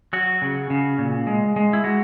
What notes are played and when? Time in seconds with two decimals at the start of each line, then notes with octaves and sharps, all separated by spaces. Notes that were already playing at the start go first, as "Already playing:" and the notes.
0.13 F#3 F#4
0.42 C#3
0.70 C#3
0.98 A#2
1.27 G#3
1.56 G#3
1.73 E4
1.84 G#3 F#4